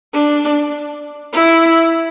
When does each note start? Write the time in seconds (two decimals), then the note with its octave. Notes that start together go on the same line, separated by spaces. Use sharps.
0.14 D4
1.34 E4